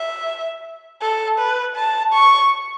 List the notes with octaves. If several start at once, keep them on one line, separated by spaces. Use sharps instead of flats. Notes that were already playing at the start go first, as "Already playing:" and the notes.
Already playing: E5
A4
B4
A5
C#6